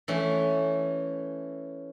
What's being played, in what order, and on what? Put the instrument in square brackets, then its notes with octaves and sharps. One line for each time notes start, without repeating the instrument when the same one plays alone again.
[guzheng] E3 A3 C#4